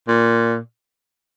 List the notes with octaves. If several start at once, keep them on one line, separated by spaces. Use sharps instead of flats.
A#2